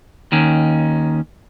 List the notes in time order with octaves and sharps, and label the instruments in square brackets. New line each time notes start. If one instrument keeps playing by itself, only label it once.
[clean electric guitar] D#2 D#3 C#4